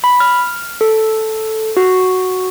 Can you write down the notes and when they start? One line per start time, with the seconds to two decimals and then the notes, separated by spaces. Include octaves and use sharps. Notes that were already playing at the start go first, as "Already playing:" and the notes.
0.04 B5
0.20 F6
0.81 A4
1.77 F#4